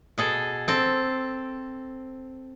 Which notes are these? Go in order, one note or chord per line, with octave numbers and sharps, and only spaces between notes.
B2 G#4 A4
C4 A4